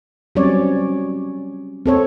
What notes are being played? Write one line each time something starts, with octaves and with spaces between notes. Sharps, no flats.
F#3 G3 C4 C#4 C#5 D5
C4 A4 C#5